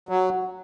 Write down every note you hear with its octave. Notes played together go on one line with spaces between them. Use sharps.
F#3